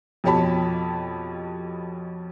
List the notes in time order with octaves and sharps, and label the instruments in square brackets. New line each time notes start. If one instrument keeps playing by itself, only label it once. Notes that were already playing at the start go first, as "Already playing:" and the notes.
[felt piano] F2 B2 G4 C#5 A5 B5